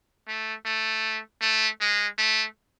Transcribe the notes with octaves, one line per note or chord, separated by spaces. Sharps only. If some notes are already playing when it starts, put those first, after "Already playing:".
A3
A3
A3
G#3
A3